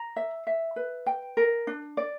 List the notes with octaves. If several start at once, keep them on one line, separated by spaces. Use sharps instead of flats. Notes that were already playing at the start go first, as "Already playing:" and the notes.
Already playing: A#5
E5
E5
B4
G5
A#4
D4
D5